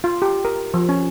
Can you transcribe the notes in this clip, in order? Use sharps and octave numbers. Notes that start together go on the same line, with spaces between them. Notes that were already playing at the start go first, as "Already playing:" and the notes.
F4
G4
A#4
F3
C#4